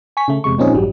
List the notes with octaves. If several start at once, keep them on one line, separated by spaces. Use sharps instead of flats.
G#5 C#6 B6
C#3 A3
E2 C3 G#3 C#6
A#2 F3 C4 C#4 D#4 G#4
A1 G2 F#3 G3